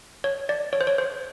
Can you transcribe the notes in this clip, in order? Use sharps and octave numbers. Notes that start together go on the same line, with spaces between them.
C#5
D5
C#5
C5
C#5
C5